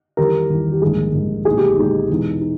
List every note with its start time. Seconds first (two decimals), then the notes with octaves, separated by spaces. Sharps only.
0.17 E2 D#3 G3 G4 A#4
0.50 E2 D#3 G3
0.71 G4
0.82 A#1 G#2 D#3 G3 G#4
1.14 A#1 G#2 D#3 G3
1.45 B1 A#2 G#3 D#4 G#4
1.57 G4
1.78 B1 A#2 G#3 D#4 G4
2.10 E2 B2 G#3 D#4
2.41 D#4